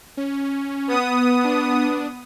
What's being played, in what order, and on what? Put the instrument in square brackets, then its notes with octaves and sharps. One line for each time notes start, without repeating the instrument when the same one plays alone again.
[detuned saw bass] C#4
[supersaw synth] B3 D#6
[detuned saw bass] D4